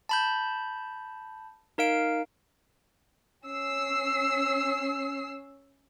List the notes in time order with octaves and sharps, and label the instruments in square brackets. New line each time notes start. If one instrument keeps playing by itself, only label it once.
[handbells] A5 B5 G6
D#4 A#4 F5 D7
[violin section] C#4 E6 C7